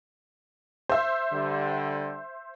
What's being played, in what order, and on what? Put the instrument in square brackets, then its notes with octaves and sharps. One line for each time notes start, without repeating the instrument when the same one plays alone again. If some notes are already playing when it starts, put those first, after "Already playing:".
[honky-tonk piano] C5 E5
[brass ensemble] D3 G3